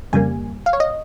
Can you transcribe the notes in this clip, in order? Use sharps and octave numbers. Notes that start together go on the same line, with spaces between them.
F2 C#3 G3 A#3 G#5
F5
C#5
D#5